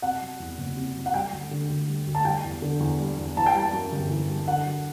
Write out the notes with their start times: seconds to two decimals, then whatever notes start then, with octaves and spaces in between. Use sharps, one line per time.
0.02 C3 F#5
0.21 F#3
0.40 E2
0.58 F#1
0.77 C3
0.95 F#3
1.06 F#5
1.14 G3 G5
1.32 D2
1.51 D3
1.69 D2
1.88 G3
2.07 D2
2.15 A5
2.25 G3 G5
2.44 E2
2.62 D3
2.80 E2
3.00 G3
3.18 E2
3.37 E3 A5
3.46 G5
3.54 G3 A5
3.73 F#2
3.92 G1
4.10 E3
4.29 G3
4.48 D3 F#5
4.66 F#3